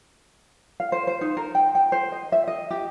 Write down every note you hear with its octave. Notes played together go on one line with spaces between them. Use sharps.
F5
C5
C5
D#4
A#4
G5
G5
C5
D#5
E5
D#5
G4